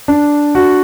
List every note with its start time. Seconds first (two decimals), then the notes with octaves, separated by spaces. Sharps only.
0.08 D4
0.55 F#4